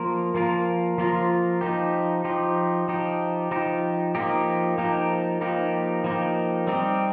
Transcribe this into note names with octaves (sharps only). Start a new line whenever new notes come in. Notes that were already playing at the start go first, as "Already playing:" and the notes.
Already playing: F3 A#3 F4 A#4
F3 A#3 F4 A#4
F3 A#3 F4 A#4
F3 D#4 G4
F3 D#4 G4
F3 D#4 G4
F3 D#4 G4
F3 A#3 D#4 G4
F3 A#3 D#4 G4
F3 A#3 D#4 G4
F3 A#3 D#4 G4
G3 C4 D#4 G4